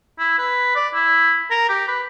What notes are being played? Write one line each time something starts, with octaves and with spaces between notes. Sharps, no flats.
E4
B4
D5
E4
A#4
G4
B4